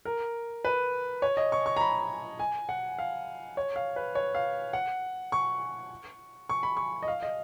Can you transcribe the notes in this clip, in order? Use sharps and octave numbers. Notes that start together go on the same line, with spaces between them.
A#4
B4
C#5
D#5
C#6
C#6
A#5
B5
G#5
F#5
F5
C#5
F5
B4
C#5
F5
F#5
C#6
C#6
B5
C#6
D#5
F5
D#5